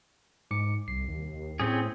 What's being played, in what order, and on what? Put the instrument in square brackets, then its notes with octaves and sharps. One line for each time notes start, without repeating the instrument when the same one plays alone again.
[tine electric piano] G#2 D6 C#7
[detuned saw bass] C2 [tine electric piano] C7
[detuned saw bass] D#2
[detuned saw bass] A2 [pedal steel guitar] C4 C#4 G#4